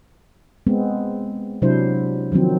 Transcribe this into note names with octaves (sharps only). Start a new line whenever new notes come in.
G#3 B3 C4
C3 F#3 D4 E4 C5
D#3 F3 F#3 C4